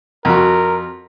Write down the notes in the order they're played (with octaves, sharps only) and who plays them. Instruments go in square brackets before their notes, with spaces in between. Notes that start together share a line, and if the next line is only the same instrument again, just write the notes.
[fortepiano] F2 F#4 [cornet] A#4